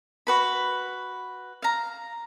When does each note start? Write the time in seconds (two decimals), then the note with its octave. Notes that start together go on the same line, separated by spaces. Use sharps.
0.27 F#4 B4 B5
1.62 F5 A#5